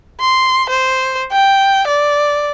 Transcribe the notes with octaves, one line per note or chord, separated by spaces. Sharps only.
C6
C5
G5
D5